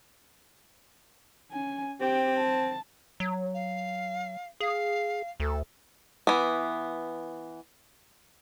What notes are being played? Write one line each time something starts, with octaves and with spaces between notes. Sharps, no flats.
C#4 G#5
C4 G4
A5
F#3
F5
G#4 F5
D2 A4
E3 B3